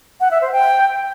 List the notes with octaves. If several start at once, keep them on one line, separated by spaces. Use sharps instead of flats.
F#5
E5
C5
G5